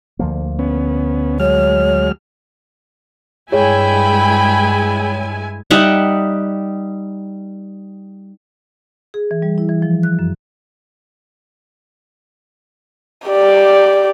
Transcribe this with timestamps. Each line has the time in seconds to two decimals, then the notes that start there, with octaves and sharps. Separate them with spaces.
0.19 D2 F3 A#3
0.59 B3 C#4
1.40 F#3 G#3 C#5 F6
3.52 G2 G#3 E4 G#4 C#5 G5 G#5 B5
5.70 G3 D#4 E5 F#5
9.14 G#4
9.31 E3
9.42 G3
9.58 E4
9.69 E3
9.82 F3
10.03 F#6
10.19 F#2
13.27 G4 D5